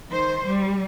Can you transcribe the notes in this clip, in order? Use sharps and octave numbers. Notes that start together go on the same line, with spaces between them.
D#3 C5
G3